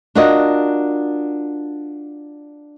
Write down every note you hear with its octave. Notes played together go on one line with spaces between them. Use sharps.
D4 F4 F#4 A#4 D#5